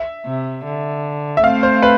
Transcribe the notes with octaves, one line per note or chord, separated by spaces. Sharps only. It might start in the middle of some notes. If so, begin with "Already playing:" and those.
Already playing: E5
C3
D3
E5
A3 C4 F5
C5
B4